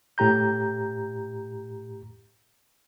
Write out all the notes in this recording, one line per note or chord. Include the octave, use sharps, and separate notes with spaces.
A2 G4 A#5 G6